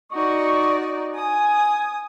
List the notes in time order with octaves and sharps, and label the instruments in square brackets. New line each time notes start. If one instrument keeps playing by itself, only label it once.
[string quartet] D#4 F#4 D5 [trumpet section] C#6
[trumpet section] G#5 [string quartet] D#6